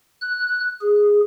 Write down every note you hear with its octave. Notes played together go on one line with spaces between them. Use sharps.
F#6
G#4